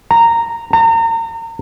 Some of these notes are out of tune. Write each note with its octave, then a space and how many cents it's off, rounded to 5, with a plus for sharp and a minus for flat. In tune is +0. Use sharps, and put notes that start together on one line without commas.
A#5 -10
A#5 -35